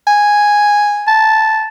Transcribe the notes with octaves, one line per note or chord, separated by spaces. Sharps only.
G#5
A5